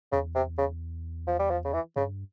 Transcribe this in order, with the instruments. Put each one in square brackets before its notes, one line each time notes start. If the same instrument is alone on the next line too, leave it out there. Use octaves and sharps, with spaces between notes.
[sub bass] E2 [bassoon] C#3
[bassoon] C3
C#3
F3
G3
F3
C#3
E3
[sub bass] G2 [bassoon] C#3